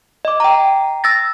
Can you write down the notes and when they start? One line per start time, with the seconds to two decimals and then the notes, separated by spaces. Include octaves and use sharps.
0.25 D#5 D6
0.40 G5 A#5
1.04 E6 A6 A#6